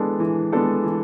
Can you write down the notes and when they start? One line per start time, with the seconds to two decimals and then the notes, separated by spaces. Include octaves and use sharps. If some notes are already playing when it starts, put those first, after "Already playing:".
Already playing: E3 G#3 B3 D4 A4
0.20 E3
0.53 G#3 B3 D4 A4
0.84 E3